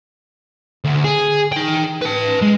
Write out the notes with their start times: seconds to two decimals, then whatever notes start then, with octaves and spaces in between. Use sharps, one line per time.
0.84 D2
1.04 G#4
1.52 D#4 G5
2.01 B4 A5
2.41 G#3